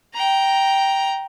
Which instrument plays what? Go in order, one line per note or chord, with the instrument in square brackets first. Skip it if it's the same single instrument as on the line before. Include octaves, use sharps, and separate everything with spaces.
[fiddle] G5 A#5